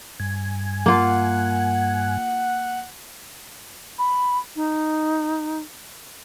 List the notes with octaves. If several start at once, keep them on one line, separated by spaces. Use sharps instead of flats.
G2 G#5
A#3 F4 F#5
B5
D#4